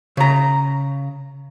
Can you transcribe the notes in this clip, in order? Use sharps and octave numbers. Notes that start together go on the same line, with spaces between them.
C#3 A#5